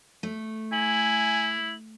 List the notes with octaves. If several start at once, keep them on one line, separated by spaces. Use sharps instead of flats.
A3
E4 G#5 F#7